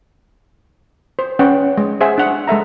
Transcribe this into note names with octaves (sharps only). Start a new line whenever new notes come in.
C5
C#4 B4 F#5 G5
G#3
G#4 C5 E5 F#5 G#5
D4 F#5
G#3 A4 E5 A#5